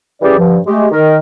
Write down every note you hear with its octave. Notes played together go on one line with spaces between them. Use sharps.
E3 G3 C#4 G4 G#4 D5
G2 D3 F3
G#3 A3 G4
D#3 A#4